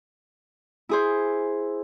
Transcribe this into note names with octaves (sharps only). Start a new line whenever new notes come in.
E4 G#4 C5